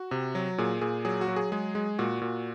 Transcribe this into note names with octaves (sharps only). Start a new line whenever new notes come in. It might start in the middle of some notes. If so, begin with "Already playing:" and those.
Already playing: F#4
C3
F#3
A#2 G#4
A#2 G#4
F#3 G#4
F#4
F#3
G#4
G#3 G#4
G#3
A#2 F#4
A#2